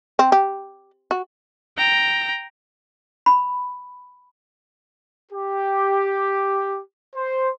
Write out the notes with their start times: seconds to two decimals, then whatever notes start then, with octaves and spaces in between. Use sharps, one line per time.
0.19 C4
0.32 G4
1.11 F#4
1.77 G5 A#5
3.26 B5
5.32 G4
7.16 C5